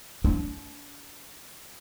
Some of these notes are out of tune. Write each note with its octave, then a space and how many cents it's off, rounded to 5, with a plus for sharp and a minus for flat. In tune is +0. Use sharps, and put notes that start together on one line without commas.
D4 -40